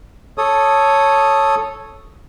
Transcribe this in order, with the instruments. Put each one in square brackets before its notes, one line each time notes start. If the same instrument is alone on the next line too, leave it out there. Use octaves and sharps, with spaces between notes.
[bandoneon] A4 C#5 D#6